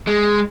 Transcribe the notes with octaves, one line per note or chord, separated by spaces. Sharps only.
G#3